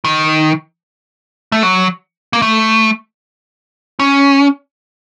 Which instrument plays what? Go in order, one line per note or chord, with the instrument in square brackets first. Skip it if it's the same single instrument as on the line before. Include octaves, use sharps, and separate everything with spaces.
[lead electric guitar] D#3
A3
F#3
A#3
A3
C#4